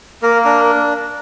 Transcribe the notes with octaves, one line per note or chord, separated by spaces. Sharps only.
A#3 A#4
D4 A#4